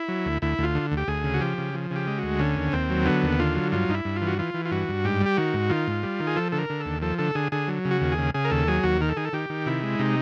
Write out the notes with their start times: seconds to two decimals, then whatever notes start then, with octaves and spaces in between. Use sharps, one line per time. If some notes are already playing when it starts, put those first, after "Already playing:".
Already playing: E4
0.08 F#3
0.25 D2
0.42 D2 E4
0.58 D2 F4
0.75 D3
0.92 D2
0.97 G4
1.08 D2 G#4
1.24 C#3
1.34 F#4
1.41 F3 G4
1.58 C#3
1.74 F3
1.91 C#3
1.96 G4
2.07 G#3
2.18 D2 F#4
2.39 D3 C#4
2.57 D#2
2.73 D#2 C4
2.90 F#3
3.05 D3 B3
3.22 D#2
3.39 D3 F4
3.55 F#3
3.72 G2 F4
3.89 G2 D#4
3.94 E4
4.05 G2
4.16 F4
4.22 E3
4.27 F#4
4.39 E3 F4
4.54 E3
4.65 F4
4.71 G2 F#4
4.88 G2
5.04 G#2 G4
5.21 G3
5.26 G4
5.37 D#3 F#4
5.54 G#2
5.70 D#3 F4
5.87 G#2
6.03 G3
6.20 D#3
6.27 G#4
6.36 F3 A4
6.52 D3 A4
6.59 A#4
6.70 D3
6.80 A4
6.86 D#2
7.02 F3 A4
7.18 D3 A4
7.35 D3 G#4
7.52 D3 G#4
7.68 F#3
7.85 C#3
7.91 F#4
8.01 D#2
8.12 G#4
8.18 C#3
8.34 C#3 G#4
8.45 A#4
8.51 D#2 A4
8.68 F#3 G#4
8.83 D#2 F#4
9.01 D#3 A#4
9.09 A4
9.17 D#3 G#4
9.25 A4
9.33 D#3 G4
9.50 D#3
9.66 C3 E4
9.83 G#3
9.99 C3 D#4